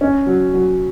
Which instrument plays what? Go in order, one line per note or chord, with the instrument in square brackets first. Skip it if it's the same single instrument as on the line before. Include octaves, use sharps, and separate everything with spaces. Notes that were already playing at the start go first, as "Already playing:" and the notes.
[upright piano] C#4
F#3
F#3